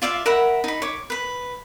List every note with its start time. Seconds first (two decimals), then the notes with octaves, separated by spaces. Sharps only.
0.02 F4 D5 E5 F5
0.26 A#4 E5 F#5 B5
0.64 D#4 B5
0.82 C#5 D6
1.10 B4 B5